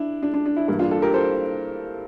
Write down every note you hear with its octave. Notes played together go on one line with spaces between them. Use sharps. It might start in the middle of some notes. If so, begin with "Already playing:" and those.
Already playing: D4 E4
D4
D4
D4
E4
G2 E3 G3 A#3 E4
D4 F4
F4 A4
G4 A#4
A4 C5